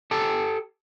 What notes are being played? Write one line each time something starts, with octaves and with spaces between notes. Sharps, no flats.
G4 A4 G5 A5